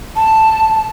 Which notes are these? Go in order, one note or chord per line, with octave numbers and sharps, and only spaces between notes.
A5